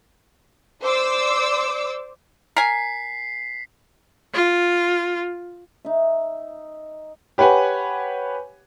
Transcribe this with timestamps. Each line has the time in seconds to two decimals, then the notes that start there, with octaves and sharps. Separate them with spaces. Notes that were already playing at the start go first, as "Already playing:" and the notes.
0.82 C5 D5 D6 E6
2.57 A#4 G#5 B6 C7
4.34 F4
5.85 D#4 E5
7.38 G4 B4 C#5 F#5 G#5